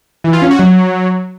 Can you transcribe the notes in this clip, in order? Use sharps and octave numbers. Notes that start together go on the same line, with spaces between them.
E3
F4
C#4
F#4
F#3